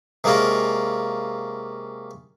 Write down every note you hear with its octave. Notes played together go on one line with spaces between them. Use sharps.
C3 G#3 A#3 C#4 F4 A#4